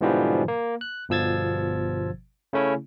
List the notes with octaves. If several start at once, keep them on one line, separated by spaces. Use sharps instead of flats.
G#2 B2 D3 E3 F3 G3
A#3
F#6
G1 B2 F3 E6 G#6 A6
C#3 A3 C#4 E4